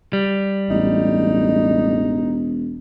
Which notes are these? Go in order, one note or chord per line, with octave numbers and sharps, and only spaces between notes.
G3
E1 A1 D#4